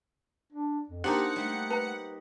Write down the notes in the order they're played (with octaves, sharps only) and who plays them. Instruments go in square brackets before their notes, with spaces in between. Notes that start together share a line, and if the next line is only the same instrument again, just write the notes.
[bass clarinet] D4
F2
[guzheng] A#3 D#4 C5 [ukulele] D4 [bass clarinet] G4 [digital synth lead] F#5
[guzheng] G3 [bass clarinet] A3
[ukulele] B4 A#5